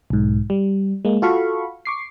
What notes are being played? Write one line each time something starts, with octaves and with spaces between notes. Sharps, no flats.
B1 G#2
G3
G#3 A#3
F4 F#4 A4 F5 B5 C#6
C#6 D6 C7